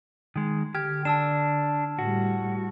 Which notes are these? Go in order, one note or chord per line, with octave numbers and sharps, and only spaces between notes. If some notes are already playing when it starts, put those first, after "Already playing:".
D#3 G#3
D3 G4 F6 G#6
D4 A5 E6 E7
A2 G3 F#4